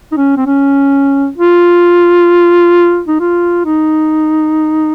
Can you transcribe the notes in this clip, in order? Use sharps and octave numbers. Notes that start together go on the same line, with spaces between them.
D#4
C#4
C4
C#4
F4
D#4
F4
D#4